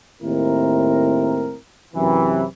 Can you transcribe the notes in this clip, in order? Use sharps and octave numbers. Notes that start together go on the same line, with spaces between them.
D#2 A2 C4 E4 A#4
F#2 C3 E3